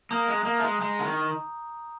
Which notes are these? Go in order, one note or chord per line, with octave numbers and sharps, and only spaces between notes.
A#3 A#5 D#6 G6
G#3
A#3
A3
G#3
G#3 A#5 D#6 G6
D3
D#3